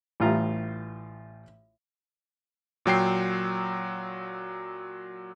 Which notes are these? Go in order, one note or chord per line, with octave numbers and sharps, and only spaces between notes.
A1 A2 G3 F4 A#5
A#2 F#3 G5 C7